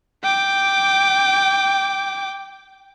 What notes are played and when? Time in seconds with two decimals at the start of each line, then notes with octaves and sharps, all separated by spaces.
0.23 G5 D6